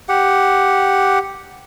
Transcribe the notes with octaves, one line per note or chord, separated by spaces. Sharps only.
G4 F#5